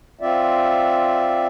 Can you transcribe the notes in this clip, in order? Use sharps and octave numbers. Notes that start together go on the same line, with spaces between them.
C4 F4 D5 E5